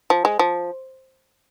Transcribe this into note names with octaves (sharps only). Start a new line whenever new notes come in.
F3
G#3
F3